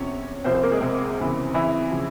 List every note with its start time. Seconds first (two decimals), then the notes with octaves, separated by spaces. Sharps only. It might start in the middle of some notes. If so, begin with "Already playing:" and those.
Already playing: E2 C3 F3 C#4 C#5
0.44 C2 C3 F3 C4 C5
0.55 C4 C5
0.63 A#3 A#4
0.72 G#3 G#4
0.81 C3 C4
1.18 E2 C#3 E3
1.54 E3 E4
1.91 C#3 F3